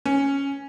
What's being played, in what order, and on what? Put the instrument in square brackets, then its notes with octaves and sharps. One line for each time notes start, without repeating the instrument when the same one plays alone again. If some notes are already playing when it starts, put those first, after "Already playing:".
[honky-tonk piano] C#4